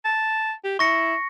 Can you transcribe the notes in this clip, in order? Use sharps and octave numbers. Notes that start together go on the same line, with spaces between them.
A5
G4
E4 C#6 A#6 C#7